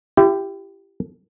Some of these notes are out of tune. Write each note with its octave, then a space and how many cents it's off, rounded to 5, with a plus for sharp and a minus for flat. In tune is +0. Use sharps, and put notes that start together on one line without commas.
E4 +40 G4 +0